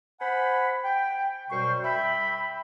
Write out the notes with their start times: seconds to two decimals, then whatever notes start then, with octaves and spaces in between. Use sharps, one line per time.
0.20 C5 F#5 G#5 B5
0.84 G5
1.50 F#2 B2 G3 C5 G5 C#6
1.84 E5 G5 B5